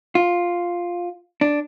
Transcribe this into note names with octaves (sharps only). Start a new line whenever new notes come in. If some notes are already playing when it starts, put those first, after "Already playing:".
F4
D4